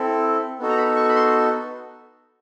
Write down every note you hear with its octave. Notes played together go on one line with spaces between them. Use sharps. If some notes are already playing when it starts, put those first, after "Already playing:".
Already playing: C4 E4 A4
B3 D#4 F#4 A4
A#5
B5
C#6
B5
C6